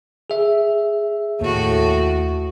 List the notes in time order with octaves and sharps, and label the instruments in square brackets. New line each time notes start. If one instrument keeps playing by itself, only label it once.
[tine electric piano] G#4 E5
[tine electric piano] D#2 [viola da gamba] A2 F#4